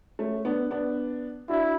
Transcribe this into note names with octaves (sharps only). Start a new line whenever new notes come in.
A3 C#4
B3 D4
B3 D4
D4 E4 F#4